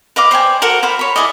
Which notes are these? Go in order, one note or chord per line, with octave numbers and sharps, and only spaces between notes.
B4 D#5 F5 D6
C5 D5 G5 G#5
F#4 A4 A#4 F#5
C5 F5 B5
C#5 B5
E4 G#4 D5 D#5